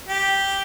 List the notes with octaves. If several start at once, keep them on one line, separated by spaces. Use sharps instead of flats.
G4